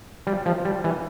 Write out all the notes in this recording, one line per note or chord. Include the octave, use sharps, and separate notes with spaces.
G3
F3
G3
E3